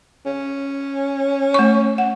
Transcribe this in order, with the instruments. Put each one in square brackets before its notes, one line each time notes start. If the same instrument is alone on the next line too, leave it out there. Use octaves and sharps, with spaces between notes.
[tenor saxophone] C#4
[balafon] A3 C#6
F#5